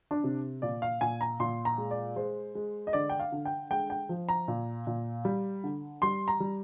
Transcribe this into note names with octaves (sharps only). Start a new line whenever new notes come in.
D4
C3
A#2 D5
F5
A#2 G#5
A#5
A#2 C6
A#5
G#3
D5
G#3 C5
G#3
D#5
D3 D5
G5
F5
D3
G5
G#3 G5
G5
F3
A#5
A#2
A#2
G3
D3
G3 C6
A#5
G3